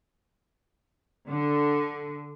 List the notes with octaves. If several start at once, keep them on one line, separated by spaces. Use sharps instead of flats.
D3